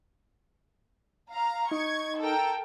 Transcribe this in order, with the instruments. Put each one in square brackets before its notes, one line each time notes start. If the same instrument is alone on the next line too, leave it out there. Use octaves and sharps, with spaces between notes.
[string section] F5 A#5
[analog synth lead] D#4 [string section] C#6 G#6
[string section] A4 A#4 G5